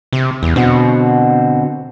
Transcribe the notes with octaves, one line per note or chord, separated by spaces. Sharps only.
C3
E2
B2 D3 C4 F#4